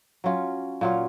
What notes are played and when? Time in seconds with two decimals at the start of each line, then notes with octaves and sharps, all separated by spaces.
0.24 F#3 C#4 F4
0.81 A#2 F#3 C#4 F4